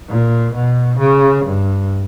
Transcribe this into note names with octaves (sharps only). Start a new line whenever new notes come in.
A#2
B2
C#3
G2